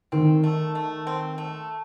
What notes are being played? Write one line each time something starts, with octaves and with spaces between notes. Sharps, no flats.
D#3 C4
A3
A3
C4
A3